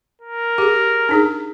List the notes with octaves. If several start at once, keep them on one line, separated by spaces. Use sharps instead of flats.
A#4
G4 G#4
D4 D#4 G#4